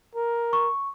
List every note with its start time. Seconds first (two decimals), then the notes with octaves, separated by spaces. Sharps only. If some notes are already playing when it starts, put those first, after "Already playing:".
0.15 A#4
0.53 C#6